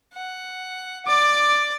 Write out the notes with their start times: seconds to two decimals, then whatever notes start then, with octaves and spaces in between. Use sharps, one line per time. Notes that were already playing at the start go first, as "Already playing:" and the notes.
0.14 F#5
1.06 D5 D6